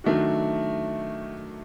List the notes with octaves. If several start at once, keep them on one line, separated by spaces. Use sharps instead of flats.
D#3 F#3 A3 D4 F#4